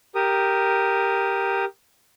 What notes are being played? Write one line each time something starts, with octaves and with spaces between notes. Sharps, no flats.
G4 A#4 D#6